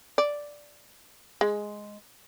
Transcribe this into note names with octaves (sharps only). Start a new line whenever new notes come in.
D5
G#3